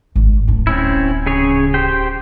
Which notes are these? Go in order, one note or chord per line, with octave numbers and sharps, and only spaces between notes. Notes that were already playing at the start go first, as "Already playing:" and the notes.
G#1
D1 D4
C4 C#4 E4
C#3 G#4 C#5
G4 C5 G5